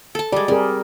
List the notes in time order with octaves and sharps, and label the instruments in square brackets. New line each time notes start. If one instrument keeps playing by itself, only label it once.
[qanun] A4 A5
[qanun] G3 G#3 [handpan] D5
[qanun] G3 [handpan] C4 G#4 A#4